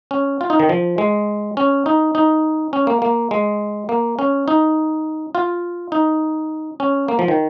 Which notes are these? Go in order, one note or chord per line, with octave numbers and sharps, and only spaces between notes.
C#4
F4
D#4
D#3
F3
G#3
C#4
D#4
D#4
C#4
A#3
A#3
G#3
A#3
C#4
D#4
F4
D#4
C#4
A#3
F3
D#3